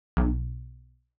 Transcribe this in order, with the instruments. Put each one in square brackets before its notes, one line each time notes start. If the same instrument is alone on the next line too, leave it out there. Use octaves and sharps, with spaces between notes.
[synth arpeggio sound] B1